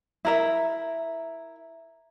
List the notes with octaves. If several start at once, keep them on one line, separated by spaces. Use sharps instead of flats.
E4 A#4 E5